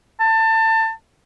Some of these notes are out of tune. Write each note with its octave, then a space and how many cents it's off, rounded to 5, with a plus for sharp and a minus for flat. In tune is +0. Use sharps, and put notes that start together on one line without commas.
A5 +25